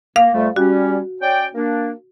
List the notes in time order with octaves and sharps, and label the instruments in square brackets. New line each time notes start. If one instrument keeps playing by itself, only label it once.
[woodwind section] A#3 [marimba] F5
[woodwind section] F2 G3 A3
[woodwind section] G3 C#4 [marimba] F#4
[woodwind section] C#4 D5 G5
A#3 D4